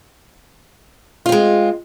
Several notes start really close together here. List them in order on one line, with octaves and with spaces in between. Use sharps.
F4 C4 G#3